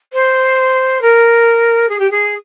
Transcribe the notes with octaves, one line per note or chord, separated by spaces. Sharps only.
C5
A#4
G#4
G4
G#4